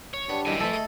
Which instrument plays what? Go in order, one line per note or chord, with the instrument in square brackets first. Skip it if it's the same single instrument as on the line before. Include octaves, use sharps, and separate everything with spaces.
[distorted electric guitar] C#5
[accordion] G3 D4 [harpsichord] B3
[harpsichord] C2 F#2 D#3 [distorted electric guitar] E5 G#5
[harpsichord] F2 B4 [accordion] A3 [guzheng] A4
[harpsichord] G#4 D#5